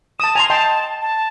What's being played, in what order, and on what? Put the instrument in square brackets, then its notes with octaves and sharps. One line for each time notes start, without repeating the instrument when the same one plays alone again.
[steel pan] A5 D#6 [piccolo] E7
[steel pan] G#5 A#5 C6 [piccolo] F7
[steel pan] D#5 G5 C6 [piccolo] A5
[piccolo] A5